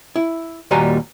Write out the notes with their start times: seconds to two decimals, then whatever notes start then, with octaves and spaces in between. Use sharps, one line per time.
0.16 E4
0.71 D#2 A#2 G3 F#4 G#5 A#5